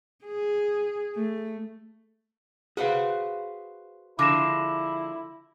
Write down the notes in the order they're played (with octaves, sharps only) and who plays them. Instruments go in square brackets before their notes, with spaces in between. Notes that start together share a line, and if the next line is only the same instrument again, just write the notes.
[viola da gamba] G#4
A3
[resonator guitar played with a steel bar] F#4 B4 C5 [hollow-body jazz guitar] G#4 F5
[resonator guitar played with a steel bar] D3 F3 G#3 [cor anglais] E4 [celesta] D6 A#6 E7